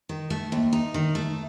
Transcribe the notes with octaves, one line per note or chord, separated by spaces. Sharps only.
D#3
A3
D#2
D#4
D#3
A3